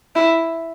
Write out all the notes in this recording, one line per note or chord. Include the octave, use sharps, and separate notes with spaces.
E4